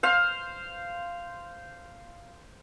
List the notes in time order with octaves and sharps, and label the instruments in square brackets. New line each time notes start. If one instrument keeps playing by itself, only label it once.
[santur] C5 F5